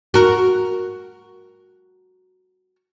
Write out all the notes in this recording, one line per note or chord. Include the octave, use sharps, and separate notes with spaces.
F#4 A#4